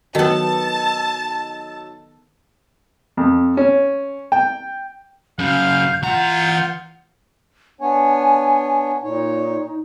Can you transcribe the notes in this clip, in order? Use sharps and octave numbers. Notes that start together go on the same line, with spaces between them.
D#3 F#3 B3 D#4 A4 A5
F2
C#4
G5
F#2 C#3 F5 G6
E3 F4 F#5 A#5 G6
B3 D4 C#5 G#5
A#2 D#4 C#5